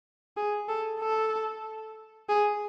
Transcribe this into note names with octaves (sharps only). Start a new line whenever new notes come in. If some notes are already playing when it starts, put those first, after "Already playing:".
G#4
A4
A4
G#4